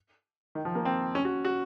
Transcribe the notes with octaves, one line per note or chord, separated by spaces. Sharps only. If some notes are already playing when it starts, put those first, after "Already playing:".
D#3
F3
A#3
C4
C#4
F#4
F#4